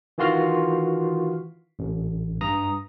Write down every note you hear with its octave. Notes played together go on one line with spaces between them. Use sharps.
D#3 E3 F4 F#4 C6 F6
A1
G2 A#5 D#6 A#6